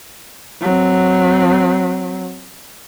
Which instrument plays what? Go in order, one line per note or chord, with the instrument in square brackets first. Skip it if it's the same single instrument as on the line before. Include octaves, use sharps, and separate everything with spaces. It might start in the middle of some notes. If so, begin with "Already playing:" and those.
[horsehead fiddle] F#3 C4